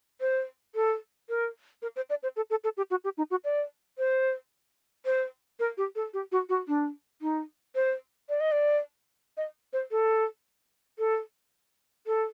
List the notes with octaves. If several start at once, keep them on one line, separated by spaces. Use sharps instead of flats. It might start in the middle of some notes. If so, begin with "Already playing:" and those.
C5
A4
A#4
A#4
C5
D5
C5
A4
A4
A4
G4
F#4
G4
D#4
F#4
D5
C5
C5
A#4
G4
A4
G4
F#4
F#4
D4
D#4
C5
D5
D#5
D5
D#5
C5
A4
A4
A4